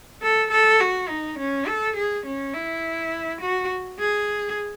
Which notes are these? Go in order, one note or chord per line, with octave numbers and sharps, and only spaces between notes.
A4
A4
F#4
D#4
C#4
A4
G#4
C#4
E4
F#4
G#4